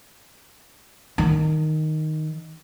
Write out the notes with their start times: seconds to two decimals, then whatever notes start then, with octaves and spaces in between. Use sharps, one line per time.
1.18 D#3